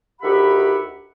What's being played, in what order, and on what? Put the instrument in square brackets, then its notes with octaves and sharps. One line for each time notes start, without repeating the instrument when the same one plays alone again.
[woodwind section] D2 D#3 G4 E5 F#5 B5